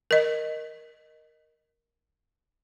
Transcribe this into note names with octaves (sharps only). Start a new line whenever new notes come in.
A#4 D#5